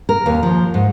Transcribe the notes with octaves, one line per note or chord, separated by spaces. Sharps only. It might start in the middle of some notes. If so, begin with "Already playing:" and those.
A#4
D#2
F3
G#2